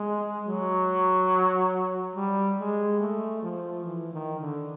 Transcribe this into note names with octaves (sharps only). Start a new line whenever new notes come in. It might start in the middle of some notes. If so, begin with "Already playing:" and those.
Already playing: G#3
F#3
G3
G#3
A3
F3
E3
D#3
D3